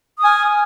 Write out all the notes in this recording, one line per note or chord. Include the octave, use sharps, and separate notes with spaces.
G#5 D#6 F6